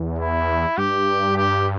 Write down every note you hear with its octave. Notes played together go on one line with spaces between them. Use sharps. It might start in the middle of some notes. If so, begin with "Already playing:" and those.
Already playing: E2
E4
G2 G4
G4